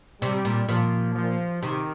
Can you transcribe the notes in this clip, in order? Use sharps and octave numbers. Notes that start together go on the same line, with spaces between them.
C3 G3
A#2
A#2 F3
F3
C3 D#3